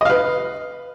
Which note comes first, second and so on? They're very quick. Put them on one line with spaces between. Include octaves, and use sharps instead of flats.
D#5 F5 B4